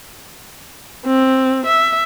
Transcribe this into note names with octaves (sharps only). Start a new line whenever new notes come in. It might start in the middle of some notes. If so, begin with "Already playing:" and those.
C4
E5